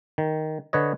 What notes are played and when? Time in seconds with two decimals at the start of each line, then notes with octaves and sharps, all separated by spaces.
0.18 D#3
0.73 D3 B4 C#5 D#5